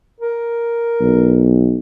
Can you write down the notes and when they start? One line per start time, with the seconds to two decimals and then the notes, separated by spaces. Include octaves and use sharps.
0.21 A#4
1.01 B1